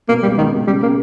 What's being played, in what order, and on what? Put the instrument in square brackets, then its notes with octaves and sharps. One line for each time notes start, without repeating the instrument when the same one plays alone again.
[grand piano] B2 [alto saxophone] A#3
[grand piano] C#2 [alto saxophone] G3
[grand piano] C#2 [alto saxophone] D#3
[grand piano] B2
[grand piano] C#3 [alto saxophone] G3
[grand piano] C#3 [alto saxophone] A#3